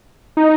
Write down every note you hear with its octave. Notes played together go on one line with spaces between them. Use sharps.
D#4